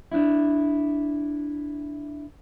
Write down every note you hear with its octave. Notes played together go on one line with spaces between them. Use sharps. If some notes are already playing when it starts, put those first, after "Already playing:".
D4 E4